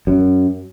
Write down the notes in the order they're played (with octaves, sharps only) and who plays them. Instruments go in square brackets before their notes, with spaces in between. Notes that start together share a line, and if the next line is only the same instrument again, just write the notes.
[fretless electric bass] F#2